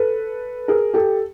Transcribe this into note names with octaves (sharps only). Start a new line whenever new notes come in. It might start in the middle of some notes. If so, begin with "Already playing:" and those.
Already playing: A4 B4
G#4 A#4
G4 A4